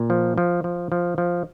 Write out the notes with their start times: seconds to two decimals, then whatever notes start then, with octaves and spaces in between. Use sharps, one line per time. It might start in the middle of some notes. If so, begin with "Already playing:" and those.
Already playing: A#2
0.10 F3
0.38 F3
0.64 F3
0.92 F3
1.18 F3